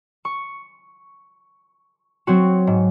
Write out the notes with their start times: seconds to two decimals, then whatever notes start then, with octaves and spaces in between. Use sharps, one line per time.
0.25 C#6
2.27 F#3 C4 F#4
2.67 G#2